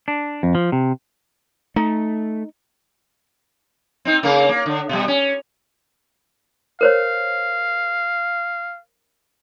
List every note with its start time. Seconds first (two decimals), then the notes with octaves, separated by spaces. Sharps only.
0.08 D4
0.43 F2
0.55 F3
0.72 C3
1.76 A3 D#4
4.05 C4 D#4
4.23 C#3 A#3 A#4
4.49 A#3
4.66 D3
4.89 B2 G3
5.08 C#4
6.81 A#4 C5 C#5 F5